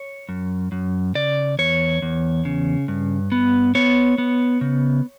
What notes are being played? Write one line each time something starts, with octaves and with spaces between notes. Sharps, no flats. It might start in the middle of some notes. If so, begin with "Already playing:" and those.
Already playing: C#5
F#2
F#2
C#3 D5
E2 C#5
E2
C#3
G2
B3
B3 C#5
B3
C#3